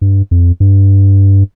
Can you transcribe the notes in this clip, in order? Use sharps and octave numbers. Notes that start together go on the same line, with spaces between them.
G2
F2
G2